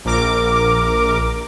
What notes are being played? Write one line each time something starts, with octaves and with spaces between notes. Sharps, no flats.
A#1 A#4 D6